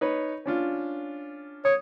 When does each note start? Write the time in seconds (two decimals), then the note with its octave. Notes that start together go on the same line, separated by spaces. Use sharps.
0.01 D#4 B4 C#5
0.46 C#4 D4 F4
1.65 C#5 D#6